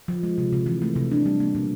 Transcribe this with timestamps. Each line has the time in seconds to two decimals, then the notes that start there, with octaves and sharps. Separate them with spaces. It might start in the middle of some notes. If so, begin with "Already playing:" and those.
0.08 F3
0.23 G#3
0.38 C3
0.53 C3
0.66 E3
0.82 A3
0.96 C3
1.11 D4
1.26 G3
1.40 A#3
1.55 B2